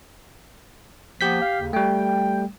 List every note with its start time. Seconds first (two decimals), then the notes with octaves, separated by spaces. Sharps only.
1.21 F3 A#3 B3 G4 G6 B6
1.42 F5
1.61 D#2 C#3
1.73 G3 A3 G5